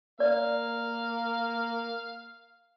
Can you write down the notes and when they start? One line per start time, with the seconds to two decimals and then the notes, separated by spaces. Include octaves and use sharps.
0.20 A#3 D5 F5